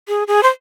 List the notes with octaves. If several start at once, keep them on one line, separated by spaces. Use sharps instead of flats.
G#4
G#4
C5